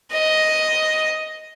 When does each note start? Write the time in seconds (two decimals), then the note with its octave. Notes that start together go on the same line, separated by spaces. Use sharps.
0.13 D#5